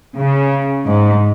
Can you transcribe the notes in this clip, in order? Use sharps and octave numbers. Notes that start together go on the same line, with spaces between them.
C#3
G#2